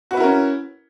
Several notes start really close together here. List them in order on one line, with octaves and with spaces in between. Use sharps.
F#4 B4 E4 A#4 C#4